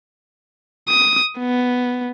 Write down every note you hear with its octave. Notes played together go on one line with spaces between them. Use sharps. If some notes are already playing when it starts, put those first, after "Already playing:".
D#6
B3